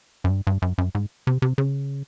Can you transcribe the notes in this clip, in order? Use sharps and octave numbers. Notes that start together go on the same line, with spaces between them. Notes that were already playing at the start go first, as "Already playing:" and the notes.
F#2
G2
G2
F#2
F#2
G#2
C3
C3
C#3